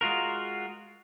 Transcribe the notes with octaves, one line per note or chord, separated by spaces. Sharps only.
G#3 F4 F#4 A#4